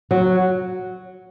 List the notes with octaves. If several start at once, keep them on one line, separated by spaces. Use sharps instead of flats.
F#3